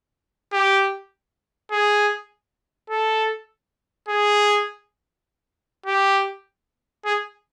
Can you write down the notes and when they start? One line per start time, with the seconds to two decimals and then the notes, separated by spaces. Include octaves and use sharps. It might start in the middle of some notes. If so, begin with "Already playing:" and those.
0.53 G4
1.72 G#4
2.90 A4
4.08 G#4
5.86 G4
7.05 G#4